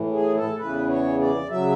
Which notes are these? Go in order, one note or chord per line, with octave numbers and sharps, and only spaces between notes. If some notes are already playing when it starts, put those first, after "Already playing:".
Already playing: A2 E3
G#4
A4
E2 C#3 E3 B4
C#5
D5
C#3 F#3 E5